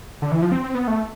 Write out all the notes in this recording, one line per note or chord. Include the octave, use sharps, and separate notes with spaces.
D3
E3
F3
C4
C4
B3
A3